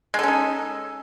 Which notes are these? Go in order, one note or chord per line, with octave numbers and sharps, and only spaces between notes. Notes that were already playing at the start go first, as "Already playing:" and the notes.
G#3 C#4 D#4 A4